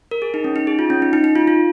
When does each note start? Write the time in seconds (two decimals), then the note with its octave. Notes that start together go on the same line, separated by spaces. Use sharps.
0.11 A#4
0.22 G#4
0.34 D#4
0.44 C#4
0.56 D#4
0.67 G#4
0.79 F4
0.90 C#4
1.02 D#4
1.13 D#4
1.24 D#4
1.36 F4
1.48 F4